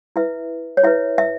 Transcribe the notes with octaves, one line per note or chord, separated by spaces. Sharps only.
E4 B4 E5
C#5
E4 B4 E5
E5